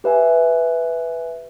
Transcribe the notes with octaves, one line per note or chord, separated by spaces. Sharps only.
G4 B4 E5 G#5